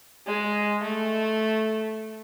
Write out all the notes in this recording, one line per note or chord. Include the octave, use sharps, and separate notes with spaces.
G#3
A3